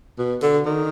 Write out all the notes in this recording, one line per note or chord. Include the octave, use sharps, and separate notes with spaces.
B2
D3
D#3